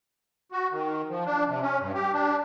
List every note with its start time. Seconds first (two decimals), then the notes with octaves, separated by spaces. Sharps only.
0.52 F#4
0.72 D#3
1.09 F3
1.25 D4
1.48 C3
1.62 C#4
1.80 G2
1.94 G4
2.13 D4